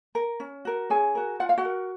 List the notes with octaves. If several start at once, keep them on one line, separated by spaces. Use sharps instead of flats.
A#4
C#4
F#4 A#4
C#4 G#4 G#5
F#4 A#4
F4 F#5
F5
F#4 F#5
A#4